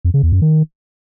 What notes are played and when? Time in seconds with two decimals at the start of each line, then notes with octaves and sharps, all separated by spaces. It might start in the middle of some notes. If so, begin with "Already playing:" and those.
0.05 F2
0.14 C#3
0.23 E2
0.32 F#2
0.42 D#3